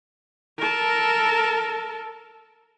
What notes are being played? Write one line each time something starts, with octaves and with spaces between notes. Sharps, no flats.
A4 A#4